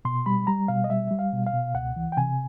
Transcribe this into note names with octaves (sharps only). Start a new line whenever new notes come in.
B2 C6
G3 B5
G3 A#5
B2 F5
D#5
G3 E5
G3
F5
B2
F5
B2
C#2 F#5
E3
G5
C3 G#5